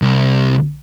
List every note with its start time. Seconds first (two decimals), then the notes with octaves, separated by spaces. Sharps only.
0.02 C2